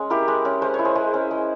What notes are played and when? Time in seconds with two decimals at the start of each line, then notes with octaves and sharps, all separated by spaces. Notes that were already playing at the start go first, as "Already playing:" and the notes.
Already playing: G#3 C#4
0.10 E4 G4 A#4
0.28 G#3
0.45 C#4
0.62 G#3 C5
0.74 E4 C#5
0.85 G#4 C5
0.95 G#3
1.14 C#4
1.31 G#3